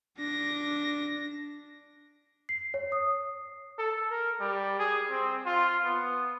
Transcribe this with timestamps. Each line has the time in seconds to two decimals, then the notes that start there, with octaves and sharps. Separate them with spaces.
0.18 D4 A#6
2.49 C7
2.74 C#5
2.92 D#6
3.78 A4
4.11 A#4
4.40 G3
4.79 G#4
5.10 C4
5.46 F4
5.84 B3